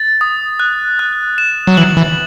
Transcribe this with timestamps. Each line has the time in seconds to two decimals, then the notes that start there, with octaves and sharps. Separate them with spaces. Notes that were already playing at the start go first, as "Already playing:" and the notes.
Already playing: A6
0.21 D#6
0.60 F#6
0.99 F#6
1.38 E7
1.67 F#3
1.77 E3 F#7
1.97 E3